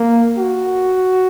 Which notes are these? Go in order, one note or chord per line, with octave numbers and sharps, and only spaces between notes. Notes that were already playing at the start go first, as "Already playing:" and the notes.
Already playing: A#3
F#4